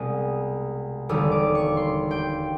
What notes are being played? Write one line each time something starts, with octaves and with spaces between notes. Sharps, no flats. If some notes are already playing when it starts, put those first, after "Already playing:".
Already playing: C2 B2 G#3 D#6
E1 D#2 D3 G3 D#6
D6
C#6
C6
G5